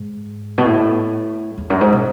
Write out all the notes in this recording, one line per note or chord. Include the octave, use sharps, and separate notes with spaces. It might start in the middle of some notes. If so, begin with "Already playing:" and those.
Already playing: G#2
B2
A2
E2
F#2
G#2
B2